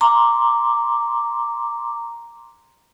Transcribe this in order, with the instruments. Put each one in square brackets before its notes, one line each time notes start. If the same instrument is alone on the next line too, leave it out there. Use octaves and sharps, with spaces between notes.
[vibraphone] A#5 C6 D6